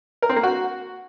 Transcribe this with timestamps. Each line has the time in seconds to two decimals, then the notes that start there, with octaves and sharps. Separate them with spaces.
0.22 A#4
0.29 C4
0.36 A#3
0.43 F#4